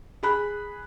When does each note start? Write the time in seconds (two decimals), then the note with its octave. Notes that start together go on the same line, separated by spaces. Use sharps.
0.23 G#4 B5 F#6